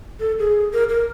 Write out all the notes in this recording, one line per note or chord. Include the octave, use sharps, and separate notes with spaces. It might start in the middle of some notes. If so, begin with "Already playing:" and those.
A4
G#4
A#4
A#4